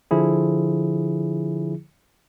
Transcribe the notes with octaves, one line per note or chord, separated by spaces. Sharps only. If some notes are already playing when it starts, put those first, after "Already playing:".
D3 F3 E4 G#4